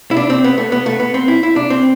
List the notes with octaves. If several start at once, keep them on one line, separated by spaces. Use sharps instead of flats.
E4
D4
C4
B3
A3
B3
A3
B3
C4
E4
E4
D4
C4